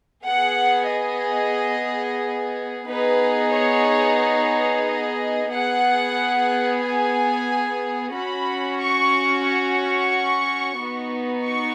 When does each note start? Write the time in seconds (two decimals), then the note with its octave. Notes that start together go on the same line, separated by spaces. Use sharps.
0.25 B3 G#4 F#5
0.91 D#5
2.88 B3 D#4 G#4 B4
3.54 C#5
4.20 C#5
4.86 D#5
5.51 B3 G#4 F#5
6.83 G#5
8.15 C#4 F#4 B5
8.80 C#6
9.46 C#6
10.79 B3 D#4 F#4
11.44 C#6